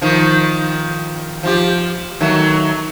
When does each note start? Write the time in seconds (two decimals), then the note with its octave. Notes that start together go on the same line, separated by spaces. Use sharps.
0.02 D#3 F3
1.43 F3 F4 G4
2.20 D#3 F#3 A3